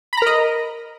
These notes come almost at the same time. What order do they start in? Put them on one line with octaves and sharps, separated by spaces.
B5 A#5 A#4 D#5